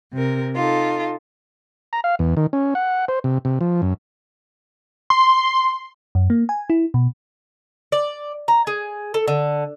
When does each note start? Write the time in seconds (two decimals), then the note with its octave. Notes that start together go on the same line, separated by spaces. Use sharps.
0.13 C3 A#4
0.53 D#4 F4 A4
1.93 A#5
2.04 F5
2.19 E2
2.37 D#3
2.53 C#4
2.75 F#5
3.08 C5
3.24 C3
3.45 C3
3.61 F3
3.82 F#2
5.10 C6
6.15 F#2
6.30 A#3
6.49 G#5
6.70 E4
6.94 B2
7.92 D5
8.48 A#5
8.67 G#4
9.14 A4
9.28 D3